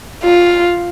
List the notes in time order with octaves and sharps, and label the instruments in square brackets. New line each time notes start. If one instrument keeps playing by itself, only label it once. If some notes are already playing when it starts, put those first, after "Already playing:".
[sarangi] F4